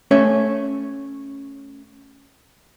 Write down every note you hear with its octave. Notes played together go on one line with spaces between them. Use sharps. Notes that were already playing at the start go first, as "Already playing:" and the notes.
A3 C#4 C#5 E5